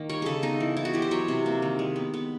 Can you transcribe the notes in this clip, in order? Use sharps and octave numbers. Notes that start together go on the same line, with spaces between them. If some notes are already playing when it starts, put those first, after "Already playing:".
Already playing: D#3 A#3
G3 C#5
C#3 G#4 A4
B3 D#4
E3
B3 E4
F#4
E3 G4
C5
F#3 C#5
C3
A#3
D#3
G#3
B3
B3